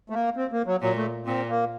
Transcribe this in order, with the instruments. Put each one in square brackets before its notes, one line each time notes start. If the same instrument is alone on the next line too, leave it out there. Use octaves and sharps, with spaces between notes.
[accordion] A3
A#3
C4
A#3
F#3
[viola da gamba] A#2 [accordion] F#3
[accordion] A3
[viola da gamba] A#2 [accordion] C4
[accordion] A#3